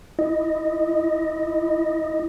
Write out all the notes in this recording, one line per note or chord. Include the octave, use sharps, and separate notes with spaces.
E4 D#5